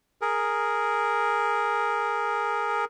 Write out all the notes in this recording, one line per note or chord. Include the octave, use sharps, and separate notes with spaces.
G#4 A#4